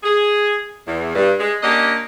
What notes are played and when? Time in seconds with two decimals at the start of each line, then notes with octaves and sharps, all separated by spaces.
0.03 G#4
0.86 E2
1.15 G2
1.39 G#3
1.62 A#3 C#4 D4 G4 D#5